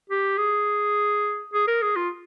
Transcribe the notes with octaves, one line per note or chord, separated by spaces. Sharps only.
G4
G#4
G#4
A#4
G#4
F4